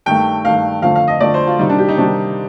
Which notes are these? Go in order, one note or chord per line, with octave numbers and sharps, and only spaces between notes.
G2 D#3 A3 G5
G2 D#3 A3 F5
F2 D3 F3 A3 F5
F5
D#5
F2 D3 F3 A3 D5
C5
F4
C3 D#3 G3 D#4
D4
G4
D#4
C3 D#3 G3 D4